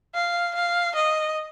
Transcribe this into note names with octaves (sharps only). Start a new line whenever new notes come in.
F5
F5
D#5